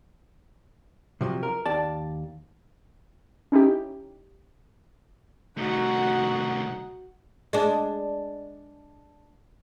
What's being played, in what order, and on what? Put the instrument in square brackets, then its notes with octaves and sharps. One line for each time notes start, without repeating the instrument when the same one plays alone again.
[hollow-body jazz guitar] C3 F3 F#3
A#4
D#2 D5 A5
[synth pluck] C#4 D#4 E4 G4
[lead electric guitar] C2 A3 [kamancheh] D#4 F#5 [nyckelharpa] F#4
[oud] G#3 D4